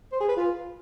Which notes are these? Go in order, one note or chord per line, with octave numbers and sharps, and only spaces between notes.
C5
G#4
B4
F4